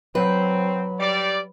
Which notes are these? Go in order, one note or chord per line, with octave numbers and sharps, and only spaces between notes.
F#3 C4 B4
G3 D5